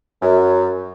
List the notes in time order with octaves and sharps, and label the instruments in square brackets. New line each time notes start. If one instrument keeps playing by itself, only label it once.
[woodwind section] F#2